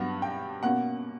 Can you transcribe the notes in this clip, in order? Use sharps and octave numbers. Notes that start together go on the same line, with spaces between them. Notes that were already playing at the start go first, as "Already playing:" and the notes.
Already playing: G2 F#3 B3 D4 F#5
G5
B2 A#3 C#4 F#5